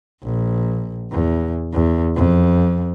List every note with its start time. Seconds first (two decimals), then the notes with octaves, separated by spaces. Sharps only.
0.22 A#1
1.11 E2
1.73 E2
2.16 F2